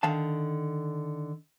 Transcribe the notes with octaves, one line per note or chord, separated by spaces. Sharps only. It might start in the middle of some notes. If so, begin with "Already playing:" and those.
D3 D#3 F5 A5